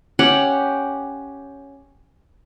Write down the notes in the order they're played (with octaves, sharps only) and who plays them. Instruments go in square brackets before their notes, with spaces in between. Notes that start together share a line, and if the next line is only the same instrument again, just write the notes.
[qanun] C#4 G4 F#5